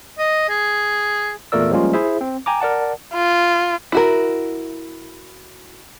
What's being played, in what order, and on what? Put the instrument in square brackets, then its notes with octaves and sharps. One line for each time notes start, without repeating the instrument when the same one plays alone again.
[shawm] D#5
G#4
[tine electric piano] E2 A#2 A3 A#4 D5 E6
F3 G3 G#3 A#3 C#4 F4
E4 G#4 C5 E5
C4
G5 G#5 A#5 D6
A#4 D5 F#5 A5
[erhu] F4
[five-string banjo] E4 F#4 A#4